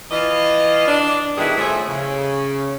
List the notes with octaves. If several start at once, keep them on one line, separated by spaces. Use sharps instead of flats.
E3 F4 D#5
D4
G2 B2 D#3 E4 G#4 B4
A2 F3 A3 G#4 E5
C#3